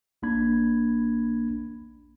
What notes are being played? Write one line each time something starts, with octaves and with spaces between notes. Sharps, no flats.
A#1 A#3 D4 B5 G#6